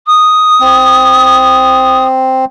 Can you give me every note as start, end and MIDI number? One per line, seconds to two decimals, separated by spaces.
0.06 2.04 87
0.60 2.45 60